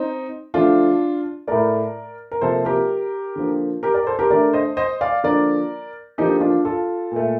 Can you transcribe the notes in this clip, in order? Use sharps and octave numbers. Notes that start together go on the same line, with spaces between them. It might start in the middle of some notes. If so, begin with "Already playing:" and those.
Already playing: C4 D#4
D3 F3 A3 D4 F4
A2 A3 A#4 D5
A#4
C3 F3 A#3 A4 C5
G4 A#4
D3 F3 A#3
G4 A#4
A#4 D5
A4 C5
G4 A#4
D3 A3 A#4 D5
C5 D#5
C5 D#5
D5 F5
D3 F3 A#3 A#4 D5
D3 F3 A#3 D#4 G4
D4 F4
F4 A4
A#2 A3